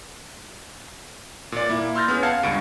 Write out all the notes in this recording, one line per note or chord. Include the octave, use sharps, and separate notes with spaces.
A#2 D5
A#3 E4
C6 E6 F6 G6 A6 A#6
B3 C#4 G#4
F5 F#5 A5 G#6 C#7
C#2 G2 C#7 D7